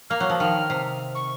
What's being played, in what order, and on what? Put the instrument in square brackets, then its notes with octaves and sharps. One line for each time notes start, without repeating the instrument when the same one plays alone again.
[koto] A#3 [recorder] F6
[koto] F#3
F3
[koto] D#3 [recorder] F6
[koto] C3
[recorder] C#6